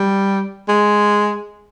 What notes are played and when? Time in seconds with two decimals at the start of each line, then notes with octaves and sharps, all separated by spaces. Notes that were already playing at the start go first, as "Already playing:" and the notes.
Already playing: G3
0.69 G#3